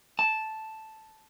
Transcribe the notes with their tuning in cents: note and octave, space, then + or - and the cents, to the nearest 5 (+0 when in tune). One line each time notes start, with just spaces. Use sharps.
A5 -5